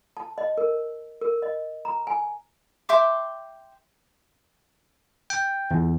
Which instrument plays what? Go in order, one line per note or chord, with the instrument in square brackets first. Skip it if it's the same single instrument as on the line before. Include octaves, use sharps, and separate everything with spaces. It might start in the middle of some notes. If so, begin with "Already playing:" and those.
[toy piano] A5
D#5
A#4
A#4
D#5
A#5
G#5
[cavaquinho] E5 G5 C6 D6
[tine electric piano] G5
E2